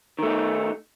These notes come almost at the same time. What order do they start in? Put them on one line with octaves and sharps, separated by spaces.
D#3 A3 D#4